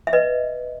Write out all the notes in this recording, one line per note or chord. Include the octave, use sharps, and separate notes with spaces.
E5
B4 D#5